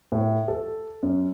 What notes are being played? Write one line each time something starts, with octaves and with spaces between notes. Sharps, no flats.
A2
A4
F#2